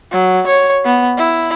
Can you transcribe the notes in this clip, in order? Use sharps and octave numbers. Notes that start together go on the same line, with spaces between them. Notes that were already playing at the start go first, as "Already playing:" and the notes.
F#3
C#5
B3
E4